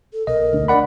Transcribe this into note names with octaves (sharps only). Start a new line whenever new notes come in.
A4
B1 A#4 D#5
D2 D4
A#4 D5 F#5 B5